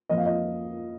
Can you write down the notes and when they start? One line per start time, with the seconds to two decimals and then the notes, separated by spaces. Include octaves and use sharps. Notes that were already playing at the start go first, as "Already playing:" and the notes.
0.09 F2 F3 A#3 D#5
0.17 F5
0.26 D#5